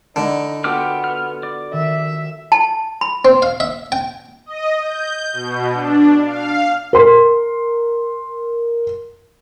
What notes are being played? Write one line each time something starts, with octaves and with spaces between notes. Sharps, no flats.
D3 D#4 E4 D#7
B3 F4 F#4 A4 G5 D6 F6
F6
D5
D#3 E5
A5
B5
C4
F5
E5
G5
D#5
G6
B2
D4
F5
A#4 C6